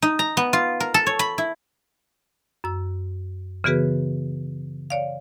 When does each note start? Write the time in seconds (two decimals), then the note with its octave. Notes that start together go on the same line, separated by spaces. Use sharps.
0.02 D#4
0.19 A#5
0.37 B3
0.53 F4
0.80 A#4
0.94 A4
1.06 C#5
1.19 B5
1.38 E4
2.64 F#2 E6
3.64 C#3 E3 B3 F#4 G#4 B4
4.90 C#5 D5 F5